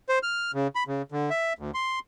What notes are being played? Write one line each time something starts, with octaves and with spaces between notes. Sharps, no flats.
C5
F6
C#3
B5
C#3
D3
E5
D2
C6